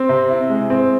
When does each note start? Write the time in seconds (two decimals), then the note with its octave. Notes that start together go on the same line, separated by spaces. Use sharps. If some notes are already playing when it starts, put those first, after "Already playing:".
Already playing: C4
0.09 C3
0.30 E4
0.49 G#3
0.70 C4